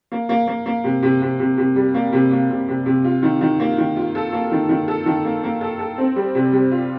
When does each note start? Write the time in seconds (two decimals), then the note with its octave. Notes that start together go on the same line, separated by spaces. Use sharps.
0.12 A#3
0.29 A#3
0.47 A#3
0.66 A#3
0.84 C3
1.03 C3
1.22 C3
1.40 C3
1.58 C3
1.76 G3
1.94 A#3
2.13 C3
2.31 A#3
2.50 C3
2.68 C3
2.86 C3
3.04 F4
3.23 D#3
3.41 D#3
3.60 A#3
3.78 D#3
3.96 F4
4.15 A4
4.33 A#3
4.52 D#3
4.69 D#3
4.88 A4
5.06 D#3
5.25 A#3
5.44 A#3
5.61 A4
5.79 A4
5.98 C4
6.16 G3
6.35 C3
6.52 G3
6.71 F4